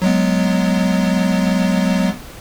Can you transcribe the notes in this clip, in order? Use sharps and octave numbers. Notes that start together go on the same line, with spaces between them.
F#3 G#3 B3